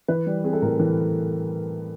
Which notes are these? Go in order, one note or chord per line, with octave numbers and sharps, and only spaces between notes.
E3 B4
G3
C4 G#4
A4
A2 A#4
E3